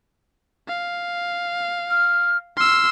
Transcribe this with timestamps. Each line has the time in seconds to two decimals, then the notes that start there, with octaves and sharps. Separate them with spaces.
0.68 F5
1.90 F6
2.57 C6 E6 F6